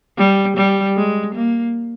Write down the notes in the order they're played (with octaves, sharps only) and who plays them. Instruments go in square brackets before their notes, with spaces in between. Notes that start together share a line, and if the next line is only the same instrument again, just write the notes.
[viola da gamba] G3
G3
G#3
A#3